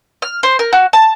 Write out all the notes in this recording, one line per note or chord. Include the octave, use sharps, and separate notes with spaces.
F6
C5
A#4
F#4
A5